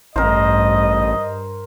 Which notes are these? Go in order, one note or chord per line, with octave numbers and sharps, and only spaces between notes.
A1 G2 A#4 C5 D#5